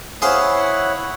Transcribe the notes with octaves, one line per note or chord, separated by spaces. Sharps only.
E4 G#4 C5 C#5 F5 F#5